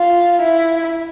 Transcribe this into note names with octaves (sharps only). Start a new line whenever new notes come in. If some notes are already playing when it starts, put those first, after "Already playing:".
Already playing: F4
E4